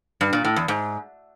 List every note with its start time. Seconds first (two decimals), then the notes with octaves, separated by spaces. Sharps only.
0.21 G2
0.33 A#2
0.45 A2
0.56 E2
0.68 G#2